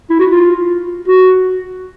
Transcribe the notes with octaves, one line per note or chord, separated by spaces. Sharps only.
E4
F#4
F4
F#4